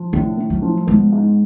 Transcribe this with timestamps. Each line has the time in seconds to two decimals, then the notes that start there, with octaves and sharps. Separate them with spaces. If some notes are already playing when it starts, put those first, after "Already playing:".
Already playing: F3
0.13 A2 D3
0.37 A2
0.50 F#3
0.62 F3
0.87 G#3 B3
1.12 G#2